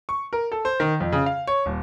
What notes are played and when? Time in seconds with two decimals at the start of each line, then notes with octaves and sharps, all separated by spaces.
0.09 C#6
0.33 A#4
0.52 A4
0.65 C5
0.80 D#3
1.00 F2
1.12 C#3
1.26 F5
1.47 C#5
1.66 D#1